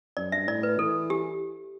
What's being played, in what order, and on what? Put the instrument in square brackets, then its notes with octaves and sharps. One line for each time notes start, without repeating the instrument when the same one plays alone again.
[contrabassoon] F#2 [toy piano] D5
[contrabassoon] G2 [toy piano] E5
[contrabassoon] A2 [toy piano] D5
[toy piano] B4
[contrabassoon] E3 [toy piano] A4
[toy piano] G4